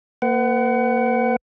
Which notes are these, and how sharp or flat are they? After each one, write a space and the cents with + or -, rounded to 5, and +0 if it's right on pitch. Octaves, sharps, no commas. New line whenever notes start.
A#3 -15 B4 +45 F#5 +25